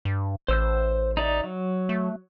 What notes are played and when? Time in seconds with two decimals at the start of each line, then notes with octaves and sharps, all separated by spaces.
0.05 G2
0.48 A1 C5 E6 G6
1.17 D#4 D5 E5
1.44 F#3
1.89 A3